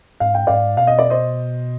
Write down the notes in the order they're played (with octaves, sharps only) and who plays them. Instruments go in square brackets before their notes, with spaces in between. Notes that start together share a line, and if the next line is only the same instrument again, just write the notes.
[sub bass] G#2 [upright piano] F5
[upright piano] G5
[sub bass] G#2 [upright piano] D5 F5
[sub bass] B2 [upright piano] F5
[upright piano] D#5
D5
C5 D#5